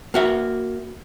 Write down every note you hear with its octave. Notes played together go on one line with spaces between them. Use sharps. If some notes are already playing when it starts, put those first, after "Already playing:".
A#3 F#4 E5